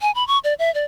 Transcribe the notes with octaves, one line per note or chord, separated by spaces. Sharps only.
G#5
B5
C#6
D5
E5
D5